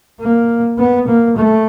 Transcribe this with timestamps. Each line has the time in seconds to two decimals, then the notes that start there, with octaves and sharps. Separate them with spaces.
0.21 A#3
0.78 B3
1.08 A#3
1.37 A3